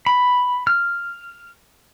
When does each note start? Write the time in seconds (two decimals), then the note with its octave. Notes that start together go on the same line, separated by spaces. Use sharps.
0.06 B5
0.67 F6